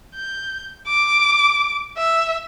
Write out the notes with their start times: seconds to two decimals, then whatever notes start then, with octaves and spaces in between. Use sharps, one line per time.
0.15 G6
0.87 D6
1.97 E5